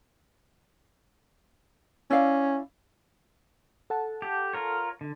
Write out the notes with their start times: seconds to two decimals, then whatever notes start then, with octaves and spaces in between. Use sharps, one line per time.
2.10 C#4 E4 D5 F5
3.90 A4 F#5 A5
4.22 G4
4.53 F4 A#4 C#5
5.01 D3